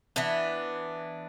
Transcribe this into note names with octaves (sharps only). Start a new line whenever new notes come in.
E3 B3 D4